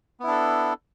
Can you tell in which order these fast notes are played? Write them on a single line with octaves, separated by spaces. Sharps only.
B3 E4 D4 A4